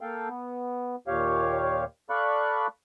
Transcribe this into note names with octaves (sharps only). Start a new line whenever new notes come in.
A#3 A4 F5 G5
B3
D#2 A#2 G4 C#5 F5
A4 D5 F5 B5 C#6 F#6